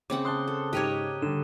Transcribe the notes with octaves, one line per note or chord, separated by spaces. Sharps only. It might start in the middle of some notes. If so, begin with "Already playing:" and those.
C#3 C4 F#5 D6
A5 C6 D#6 F#6 G7
A4
G#2 G4 A#4 C#5 F#6 D#7
D3 G3 E7